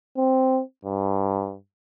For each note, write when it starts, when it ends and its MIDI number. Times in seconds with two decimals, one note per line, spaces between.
0.17 0.60 60
0.85 1.55 43